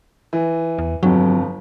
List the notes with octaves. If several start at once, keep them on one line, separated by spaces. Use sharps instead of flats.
E3
E2
G1 F2 F#3